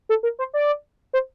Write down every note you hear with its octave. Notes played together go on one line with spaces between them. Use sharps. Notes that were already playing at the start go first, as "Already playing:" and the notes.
A4
A#4
C5
D5
C5